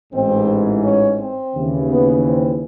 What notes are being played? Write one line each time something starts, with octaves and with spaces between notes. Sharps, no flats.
A1 G#2 E3 C4
C#4
C4
D#2 C#3 E3
B3
C4